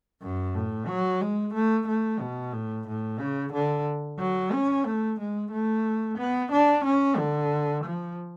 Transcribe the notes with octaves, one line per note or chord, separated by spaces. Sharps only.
F#2
A2
F#3
G#3
A3
A3
B2
A2
A2
C#3
D3
F#3
C#4
A3
G#3
A3
B3
D4
C#4
D3
F3